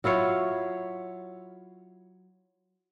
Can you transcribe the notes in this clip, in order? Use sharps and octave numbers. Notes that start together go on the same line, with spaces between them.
F#3 E4 F4 C#5